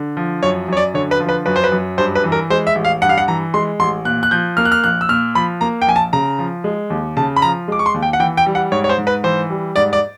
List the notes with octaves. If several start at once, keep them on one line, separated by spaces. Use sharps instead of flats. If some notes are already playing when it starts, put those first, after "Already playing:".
Already playing: D3
F3
F#2 C#5
F#2 C#5
D5
D3 C#5
B4
F3
B4
F#2 B4
C5
B4
F#2
G2 C5
B4
E3
A#4
G#3 C5
E5
A1
F5
G2 F#5
F5
F#5
E3 A#5
G#3 C6
A1 C6
A#2 F#6
F#6
F3 G6
A#3 F6
F#6
F6
A#1 F#6
E6
A#2 F6
F3 B5
A#3 A#5
G5
A#1 G#5
A5
C#3 A#5
F3
G#3
D#2
C#3 A5
B5
F3 A#5
G#3 D6
C#6
C6
D#2
G5
F#5
E3 G5
G5
G3
F#5
G#2 C#5
C#5
C5
G#2
B4
E3 C5
G3
G#2 D5
D5